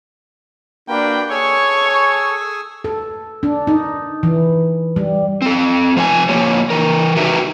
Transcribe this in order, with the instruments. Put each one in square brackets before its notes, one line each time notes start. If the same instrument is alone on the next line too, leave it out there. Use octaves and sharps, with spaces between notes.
[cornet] A#3 [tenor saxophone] D4 [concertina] F#4 G4 B4 [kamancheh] G5
[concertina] G#4 G#5 E6 [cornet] A4 [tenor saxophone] C#5 [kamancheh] C#6
[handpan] A4
D4
D#4
E3
G3
[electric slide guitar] C4 A4
F3 C5 F5 G#5
F3 A#3 G4 C#5
E3 A#4
D#4 F#4 G4 A#4 B4 E5